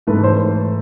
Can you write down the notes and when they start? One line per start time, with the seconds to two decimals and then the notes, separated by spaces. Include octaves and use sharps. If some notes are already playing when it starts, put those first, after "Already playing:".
0.07 G#2 E3 A3 B4
0.24 C5